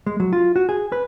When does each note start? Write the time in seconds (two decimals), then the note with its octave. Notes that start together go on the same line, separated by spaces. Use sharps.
0.06 G#3
0.20 F#3
0.33 F4
0.56 F#4
0.69 G#4
0.92 B4